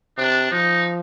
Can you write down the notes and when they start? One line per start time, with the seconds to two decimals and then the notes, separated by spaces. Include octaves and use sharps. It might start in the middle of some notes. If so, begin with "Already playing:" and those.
0.18 C3 D4
0.51 F3 D#4